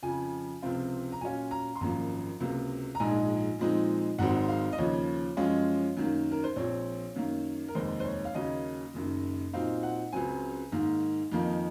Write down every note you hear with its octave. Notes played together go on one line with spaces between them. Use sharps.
F2 C#3 F3 G#5
C#2 C3 F3 C4 F4
A#5
A#2 F#3 C#4 F4 G#5
A#5
C6
G#1 F#2 F3 A#3 A#5
C#2 C3 F#3 A#3
A#5
A#1 G#2 F3 G#3 D#4 G#5
A#2 F3 G#3 C4 D#4
G#1 G#2 F#3 C4 F#5
F5
D#5
D#2 C#3 F3 C#5
F#2 F3 G#3 C#4 F4
F#2 D#3 A#3
A#4
C5
A#1 A#2 F3 C4 C#5
F#2 D#3 A#3
A#4
F1 D#2 D#3 G#3 C5
C5
C#5
F5
D#2 C#3 F#3 A#3 C#4 D#5
F#1 F#2 D#3
A#2 F#3 C4 D#4 F5
F#5
C#2 C#3 F#3 C4 G#5
G#2 D#3 A#3
F2 D#3 A#3 D#4